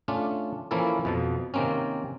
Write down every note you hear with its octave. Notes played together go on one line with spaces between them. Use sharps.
A3 C#4 D4 F4
E3 F3 A#3 C#4 E4 A4
F2 B2 F3
C3 D#3 A#3 C4 C#4